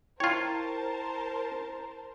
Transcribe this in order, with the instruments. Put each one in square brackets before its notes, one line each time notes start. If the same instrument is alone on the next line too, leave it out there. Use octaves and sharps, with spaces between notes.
[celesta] E4 G5 [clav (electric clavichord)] F4 C#5 [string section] A#4 C5 A5